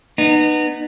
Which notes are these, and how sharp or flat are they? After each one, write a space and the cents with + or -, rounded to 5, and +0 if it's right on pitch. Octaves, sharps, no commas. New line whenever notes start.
B3 +0 D#4 -30